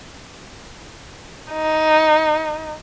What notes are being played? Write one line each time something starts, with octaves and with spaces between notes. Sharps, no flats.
D#4